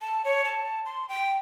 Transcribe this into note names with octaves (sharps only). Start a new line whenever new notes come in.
A5
C#5
A5
C6
G5